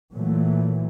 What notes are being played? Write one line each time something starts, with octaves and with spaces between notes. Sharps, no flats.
A#2 E3 F#3 A3